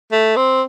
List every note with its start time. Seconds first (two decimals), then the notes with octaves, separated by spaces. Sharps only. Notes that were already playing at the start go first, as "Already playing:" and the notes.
0.12 A3
0.36 C4